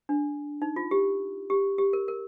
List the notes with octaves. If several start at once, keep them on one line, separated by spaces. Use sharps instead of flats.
D4
D#4
F4
G4
G4
G4
A#4
A#4